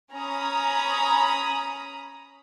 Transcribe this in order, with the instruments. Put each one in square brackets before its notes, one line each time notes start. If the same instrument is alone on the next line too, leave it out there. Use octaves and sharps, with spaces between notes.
[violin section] C#4 A#5 B5 D#6